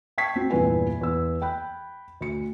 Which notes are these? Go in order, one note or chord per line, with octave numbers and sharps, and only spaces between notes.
G5 A5 C#6 G#6 B6 C7
C4 F#4
E2 G2 A#2 E4 B4 G#5
E2 E6
G5 B5 F#6
D2 C#7